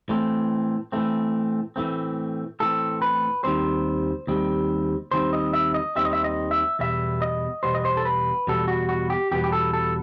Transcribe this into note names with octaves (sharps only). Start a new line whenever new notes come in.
A2 E3 A3 C4
A2 E3 A3 C4
A2 E3 A3 C4
A2 E3 A3 C4 A4
B4
D#2 D#3 G3 C4 C5
D#2 D#3 G3 C4
D#2 D#3 G3 C4 C5
D#5
E5
D#5
D#2 D#3 G3 C4 E5
D#5
E5
D#5
E5
E2 B2 G3 B3 E5
D#5
E2 B2 G3 B3 C5
D#5
C5
A4
B4
E2 B2 G3 B3 A4
F#4
F#4
G4
E2 B2 G3 B3 G4
G4
A4
A4